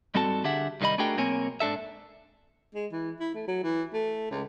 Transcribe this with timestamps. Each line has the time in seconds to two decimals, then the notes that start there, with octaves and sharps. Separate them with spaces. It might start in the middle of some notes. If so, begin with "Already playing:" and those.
0.14 G#2 G3 C4 F#4 A4 A5
0.44 D3 D4 G4 G#4 E5 F#5
0.81 C2 D#3 G3 D#5 B5
0.98 A3 D4 F#4 G#4 A#4 G5
1.17 B1 A#3 C4 A#4 C#5 G#5
1.60 G#2 D4 A4 E5
2.74 G#3
2.92 E3
3.20 E4
3.34 A3
3.48 F#3
3.63 E3
3.93 A3
4.30 C#2